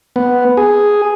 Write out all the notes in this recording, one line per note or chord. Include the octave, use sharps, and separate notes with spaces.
B3
G#4